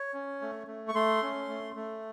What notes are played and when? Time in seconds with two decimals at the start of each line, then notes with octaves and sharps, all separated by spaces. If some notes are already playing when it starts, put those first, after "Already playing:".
Already playing: C#5
0.14 C#4
0.42 A3
0.68 A3
0.88 C#6
0.95 A3 C6
1.22 C#4
1.48 A3
1.76 A3